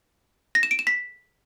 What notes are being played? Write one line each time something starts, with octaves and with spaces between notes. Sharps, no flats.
A#6
E7
D7
E7
B6